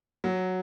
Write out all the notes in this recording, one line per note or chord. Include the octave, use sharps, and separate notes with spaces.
F#3